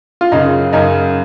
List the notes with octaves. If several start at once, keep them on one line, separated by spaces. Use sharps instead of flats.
F4
F#2 C#3 D#4
F#2 C#3 D#4